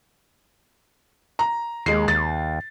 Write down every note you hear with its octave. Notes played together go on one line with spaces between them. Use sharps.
A#5
D#2 G#3 C7
D#2 A6